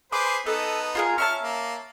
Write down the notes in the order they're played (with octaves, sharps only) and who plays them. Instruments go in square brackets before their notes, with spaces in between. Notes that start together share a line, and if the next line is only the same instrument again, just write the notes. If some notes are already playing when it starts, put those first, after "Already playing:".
[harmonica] G#4 B4 C5 [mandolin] D6
[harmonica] B3 D#4 [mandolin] A4
[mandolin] F4 G#4 A#4
[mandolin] C#4 E5 A5 [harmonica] F6
[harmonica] A#3